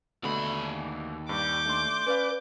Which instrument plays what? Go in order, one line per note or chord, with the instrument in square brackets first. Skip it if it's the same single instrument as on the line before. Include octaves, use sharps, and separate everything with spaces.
[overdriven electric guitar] D#2 B5 [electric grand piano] B2 D3 A3
[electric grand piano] G2 G3 [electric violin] D6 G6
[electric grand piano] A3 D4 C6
[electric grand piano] C#4 D5 F5 [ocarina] B4